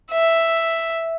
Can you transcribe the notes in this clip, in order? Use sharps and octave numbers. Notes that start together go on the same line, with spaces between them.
E5